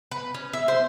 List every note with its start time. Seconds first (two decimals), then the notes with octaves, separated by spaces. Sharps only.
0.11 B4
0.34 C#4
0.53 E5
0.68 C5